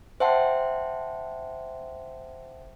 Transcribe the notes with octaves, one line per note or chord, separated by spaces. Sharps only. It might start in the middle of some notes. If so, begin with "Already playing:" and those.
C5 E5 F#5 G5 A5 C6